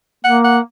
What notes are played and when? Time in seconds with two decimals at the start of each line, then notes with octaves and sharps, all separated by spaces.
0.24 A#3 F#5
0.44 F#5